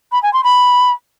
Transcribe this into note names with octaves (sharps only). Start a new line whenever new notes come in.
B5
G#5
C6
B5